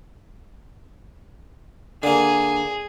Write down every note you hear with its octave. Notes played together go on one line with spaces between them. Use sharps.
D3 A#3 G#4